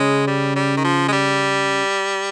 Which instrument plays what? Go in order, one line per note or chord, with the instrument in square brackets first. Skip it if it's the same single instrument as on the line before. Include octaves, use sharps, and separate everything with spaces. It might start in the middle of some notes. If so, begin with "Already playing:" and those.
Already playing: [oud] C#3 [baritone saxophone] G#3
[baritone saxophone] G3
G3
D#3
F3
G#3
G3